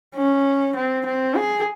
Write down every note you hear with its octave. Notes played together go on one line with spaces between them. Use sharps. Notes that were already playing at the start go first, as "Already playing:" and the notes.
C#4
C4
C4
G#4